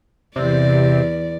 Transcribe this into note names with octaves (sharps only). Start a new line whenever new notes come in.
E2 C3 D5